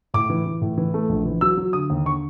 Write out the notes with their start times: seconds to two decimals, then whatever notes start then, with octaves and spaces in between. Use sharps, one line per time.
0.14 A2 D6
0.30 E3
0.46 E3
0.61 A2
0.78 E3
0.94 A3
1.09 A#1
1.25 E3
1.41 F#3 E6
1.57 F#3
1.73 D3 D#6
1.90 D#2
2.06 D3 C#6